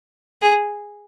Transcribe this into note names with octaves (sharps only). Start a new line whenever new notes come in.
G#4